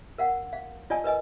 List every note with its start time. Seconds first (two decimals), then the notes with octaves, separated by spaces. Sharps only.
0.18 A#4 F5 F#5
0.53 F5
0.90 F4 D5 D#5 G#5 A5
1.04 A#4 B4 D#5 G#5